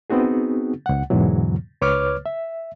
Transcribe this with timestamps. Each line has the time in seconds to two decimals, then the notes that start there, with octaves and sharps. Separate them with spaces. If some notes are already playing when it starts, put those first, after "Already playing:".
0.10 B3 C4 D#4 F#4 G#4
0.86 C#2 F#5
1.10 E2 G#2 B2 D3 E3 F#3
1.81 C#2 B4 C#5 D6 F6
2.26 E5